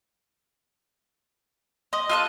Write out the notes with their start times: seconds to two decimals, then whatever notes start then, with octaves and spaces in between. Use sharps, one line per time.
1.93 D#5 C6 D#6
2.09 F4 A4 C6 F#6 D#7